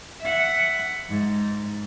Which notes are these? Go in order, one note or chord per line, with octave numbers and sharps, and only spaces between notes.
E5 F#5
G#2